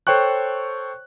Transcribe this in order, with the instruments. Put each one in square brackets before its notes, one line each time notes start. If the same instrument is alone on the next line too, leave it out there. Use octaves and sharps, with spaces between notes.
[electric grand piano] A4 C5 C#5 G5 C#6 F#6